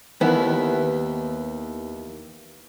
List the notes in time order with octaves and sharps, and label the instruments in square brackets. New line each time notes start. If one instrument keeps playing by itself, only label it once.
[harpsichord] D#2 [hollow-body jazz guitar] B3 E4